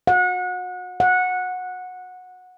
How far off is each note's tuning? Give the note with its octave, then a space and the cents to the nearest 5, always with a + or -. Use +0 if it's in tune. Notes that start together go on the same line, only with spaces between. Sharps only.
F#5 -30
F#5 -15